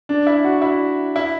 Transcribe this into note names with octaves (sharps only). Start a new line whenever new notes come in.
D4
E4
F#4
E4
E4